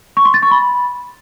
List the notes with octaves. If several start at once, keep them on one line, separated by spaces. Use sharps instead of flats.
C#6
C6
A6
C#6
B5